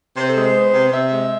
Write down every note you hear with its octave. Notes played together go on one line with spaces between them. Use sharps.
C3 C5
A4
G#3
C5
B3
C3
C3 E5
G#3